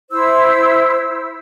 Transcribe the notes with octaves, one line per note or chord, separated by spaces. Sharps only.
E4 C5 E6